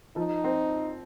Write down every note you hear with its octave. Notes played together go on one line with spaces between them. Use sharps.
F3 D#4
C4